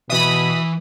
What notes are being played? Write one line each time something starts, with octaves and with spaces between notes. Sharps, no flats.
B2 E3 E5 B5 D#6